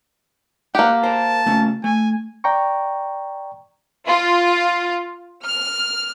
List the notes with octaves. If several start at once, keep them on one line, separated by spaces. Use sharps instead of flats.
A#3 G4 F#5
A#4 C5 A5
C#3 A3 C#4
A3 G#5
D5 G5 A#5 C#6
F4
F6